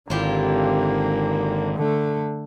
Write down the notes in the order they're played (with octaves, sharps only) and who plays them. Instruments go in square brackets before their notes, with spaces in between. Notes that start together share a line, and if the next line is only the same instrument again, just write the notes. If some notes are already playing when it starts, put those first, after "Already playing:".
[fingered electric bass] G#1 [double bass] D3 A#3 [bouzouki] E4 F4 G4
[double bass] D3 A3